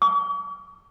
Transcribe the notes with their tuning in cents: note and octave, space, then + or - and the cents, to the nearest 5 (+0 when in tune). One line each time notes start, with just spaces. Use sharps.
C#6 +45